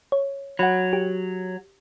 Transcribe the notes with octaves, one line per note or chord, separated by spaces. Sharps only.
C#5
F#3 F#5 B5
G4